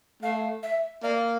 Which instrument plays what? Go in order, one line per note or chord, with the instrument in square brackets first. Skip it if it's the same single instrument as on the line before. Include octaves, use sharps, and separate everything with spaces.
[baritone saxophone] A3 [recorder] F5
[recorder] E5
[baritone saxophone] A#3 [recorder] D5